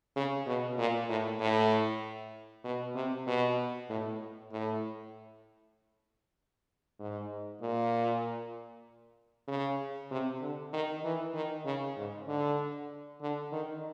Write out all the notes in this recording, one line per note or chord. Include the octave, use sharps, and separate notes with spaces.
C#3
B2
A#2
A2
A2
B2
C3
B2
A2
A2
G#2
A#2
C#3
C3
D3
D#3
E3
D#3
C#3
G#2
D3
D3
D#3